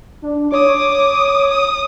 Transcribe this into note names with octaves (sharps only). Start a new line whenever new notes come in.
D4
C#5 D6 D#6
D#6